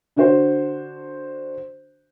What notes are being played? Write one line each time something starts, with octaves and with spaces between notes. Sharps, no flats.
D3 D4 F#4 C5